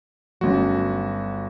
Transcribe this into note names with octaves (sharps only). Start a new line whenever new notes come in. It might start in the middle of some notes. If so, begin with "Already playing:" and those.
G1 F#3 A3 C#4 F#4